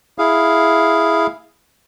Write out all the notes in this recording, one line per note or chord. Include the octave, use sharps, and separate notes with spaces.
E4 G#4 F5